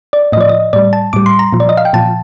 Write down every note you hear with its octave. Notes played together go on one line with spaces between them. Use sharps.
D5
A2 F3 D5 D#5
D#5
A2 G3 D5
A5
A2 G3 D6
C6
A#5
A#2 F3
D5
D#5
F5
G5
A#2 F3 A5